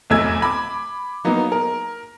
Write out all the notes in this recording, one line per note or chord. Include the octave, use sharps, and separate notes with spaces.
F1 B1 E2 A3 E6 G#6
B5 D6
F#3 A#3 B3 D#4
A#4